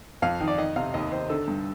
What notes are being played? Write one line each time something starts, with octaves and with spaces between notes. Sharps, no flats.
F2 F5
D#3
D5
D#3 D#5
C3 F5
D#2 D#5
D#3 C5
D3 A4
G2